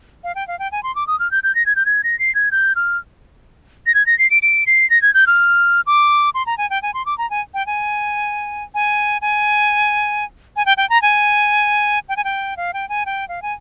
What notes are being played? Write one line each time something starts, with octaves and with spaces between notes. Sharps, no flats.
F5
G5
F5
G5
G#5
C6
D6
D#6
F6
G6
G6
A#6
G#6
G6
G#6
A#6
C7
G#6
G6
F6
A#6
G#6
A#6
C7
D7
D7
C7
A#6
G#6
G6
F6
D6
C6
A#5
G#5
G5
G#5
C6
D6
A#5
G#5
G5
G#5
G#5
G#5
G#5
G5
G5
A#5
G#5
G5
G#5
G5
F5
G5
G#5
G5
F5
G#5